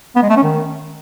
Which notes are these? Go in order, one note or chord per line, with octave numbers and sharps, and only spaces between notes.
B3
G#3
A3
C#4
D#3